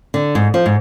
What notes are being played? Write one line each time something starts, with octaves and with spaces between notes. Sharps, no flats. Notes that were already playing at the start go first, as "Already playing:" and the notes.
D3
G#2
F3
G#2